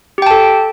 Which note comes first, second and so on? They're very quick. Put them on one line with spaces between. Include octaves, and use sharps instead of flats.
G4 G5 A5 A4